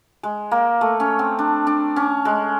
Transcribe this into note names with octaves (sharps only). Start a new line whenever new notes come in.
G#3
A#3
A3
C#4
C4
D4
D4
C#4
G#3